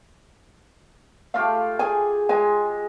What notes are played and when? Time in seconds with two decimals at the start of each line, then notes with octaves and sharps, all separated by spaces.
1.34 A3 F4 G4 F5
1.79 G#4 G#5
2.29 G#3 G#5